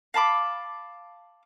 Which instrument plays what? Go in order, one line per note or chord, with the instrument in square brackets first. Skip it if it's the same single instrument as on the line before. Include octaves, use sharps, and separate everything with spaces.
[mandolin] F5 A5 B5 D6